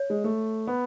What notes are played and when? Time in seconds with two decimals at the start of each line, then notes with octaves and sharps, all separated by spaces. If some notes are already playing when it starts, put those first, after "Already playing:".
Already playing: C#5
0.10 G#3
0.24 A3
0.67 B3